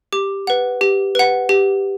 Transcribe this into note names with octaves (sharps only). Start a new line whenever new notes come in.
G4 D6
B4 F#5
G4
B4 F#5
G4